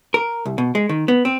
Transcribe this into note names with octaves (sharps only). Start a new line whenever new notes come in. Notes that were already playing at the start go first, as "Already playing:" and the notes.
A#4
C2
B2
G#3
D#3
B3
C4